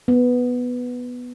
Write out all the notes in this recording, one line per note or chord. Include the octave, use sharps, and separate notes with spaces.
B3